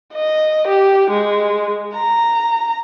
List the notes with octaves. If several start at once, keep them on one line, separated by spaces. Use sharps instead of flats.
D#5
G4
G#3
A#5